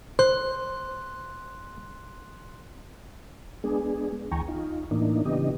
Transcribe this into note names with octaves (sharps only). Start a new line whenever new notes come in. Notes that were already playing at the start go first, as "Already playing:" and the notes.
C5 C6 F#6
G#3 B3 D4 G#4
D2 E3 G5 G#5 A#5 C#6
D#4 F4
A2 E3 A#3 D4 D#4
C#3 E3 B3 D4 G4 D#5